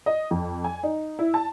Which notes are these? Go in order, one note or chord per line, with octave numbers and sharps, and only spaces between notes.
D#5
F2
G#5
D#4
E4
A5